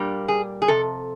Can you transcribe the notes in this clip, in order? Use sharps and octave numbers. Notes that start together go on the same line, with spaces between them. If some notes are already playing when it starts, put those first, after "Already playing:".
Already playing: A#2 G3 A#3 D4
G#4
G#4
F2 C3 A4